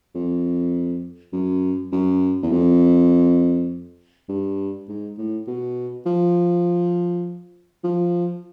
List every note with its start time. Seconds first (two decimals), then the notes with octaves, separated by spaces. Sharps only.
0.15 F2
1.33 F#2
1.92 F#2
2.43 E2
2.52 F2
4.29 G2
4.88 G#2
5.18 A2
5.47 B2
6.06 F3
7.84 F3